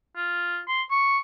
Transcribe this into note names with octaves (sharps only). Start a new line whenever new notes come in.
F4
C6
C#6